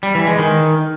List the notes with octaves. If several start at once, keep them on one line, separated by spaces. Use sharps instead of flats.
G3
E3
G#3
D#3